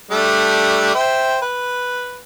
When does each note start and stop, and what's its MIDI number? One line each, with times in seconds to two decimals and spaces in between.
0.11 0.93 55
0.11 0.93 57
0.11 0.93 62
0.95 1.39 72
0.95 1.39 76
0.95 1.39 79
1.42 2.24 71